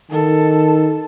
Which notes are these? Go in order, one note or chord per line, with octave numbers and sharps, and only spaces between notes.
D#3 A4